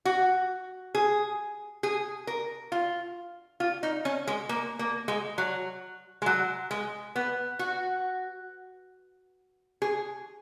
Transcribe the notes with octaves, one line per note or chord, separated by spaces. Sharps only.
F#4
G#4
G#4
A#4
F4
F4
D#4
C#4
G#3
A#3
A#3
G#3
F#3
G#3
F#3
G#3
B3
F#4
G#4